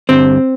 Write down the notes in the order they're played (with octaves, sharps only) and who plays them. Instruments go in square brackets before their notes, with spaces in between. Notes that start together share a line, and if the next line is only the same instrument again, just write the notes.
[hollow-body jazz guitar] G2 D3 G3 C4 C5